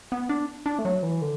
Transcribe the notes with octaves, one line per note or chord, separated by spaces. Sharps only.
B3
D4
D4
A3
F#3
E3
D3